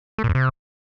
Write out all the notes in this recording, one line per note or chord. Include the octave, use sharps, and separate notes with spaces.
A3
A#2
F2
C3